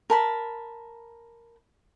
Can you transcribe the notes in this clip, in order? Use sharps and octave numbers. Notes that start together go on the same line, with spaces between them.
A#4 A5 B5